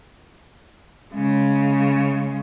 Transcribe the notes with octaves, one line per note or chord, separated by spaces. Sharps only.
C#3 G#3